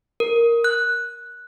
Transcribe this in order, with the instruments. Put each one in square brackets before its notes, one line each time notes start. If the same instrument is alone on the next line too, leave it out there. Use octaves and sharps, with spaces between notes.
[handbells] A#4
F#6